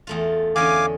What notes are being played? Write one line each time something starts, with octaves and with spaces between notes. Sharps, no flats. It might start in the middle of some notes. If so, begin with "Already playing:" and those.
E2 A3 F4
E2 D3 C#4 F5 G#5 D6